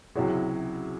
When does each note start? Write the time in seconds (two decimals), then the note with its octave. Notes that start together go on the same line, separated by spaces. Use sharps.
0.15 C#2 C3 F#3 C#4 E4 F#4 G#4